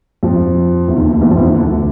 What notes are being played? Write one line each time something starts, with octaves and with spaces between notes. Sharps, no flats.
F2 F3
E2 E3
D#2 D#3
D2 D3
D#2 D#3
E2 E3
F2 F3
E2 E3
D#2 D#3
D2 D3